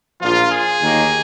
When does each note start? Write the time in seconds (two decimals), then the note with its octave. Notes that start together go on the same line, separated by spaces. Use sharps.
0.21 A#1 A#2 F3 F4
0.51 G#4
0.81 D#2 D#3 A#3